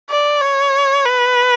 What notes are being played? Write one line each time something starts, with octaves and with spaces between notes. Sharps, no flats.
D5
C#5
B4